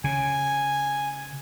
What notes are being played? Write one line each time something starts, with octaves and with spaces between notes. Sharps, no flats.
C#3 G#5